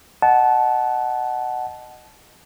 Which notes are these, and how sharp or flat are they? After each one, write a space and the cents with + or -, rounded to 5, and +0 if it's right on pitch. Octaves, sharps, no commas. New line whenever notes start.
D#5 -10 F#5 +10 A5 -20